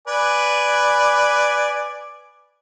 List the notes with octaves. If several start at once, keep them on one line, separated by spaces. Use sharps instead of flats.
B4 D5 G#5